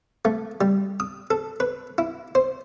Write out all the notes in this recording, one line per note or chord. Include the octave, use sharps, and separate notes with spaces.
A3
G3
D#6
A4
B4
E4
C5